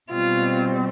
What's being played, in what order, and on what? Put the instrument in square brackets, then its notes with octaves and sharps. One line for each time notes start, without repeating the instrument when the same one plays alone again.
[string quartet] B2 G3 C4 F4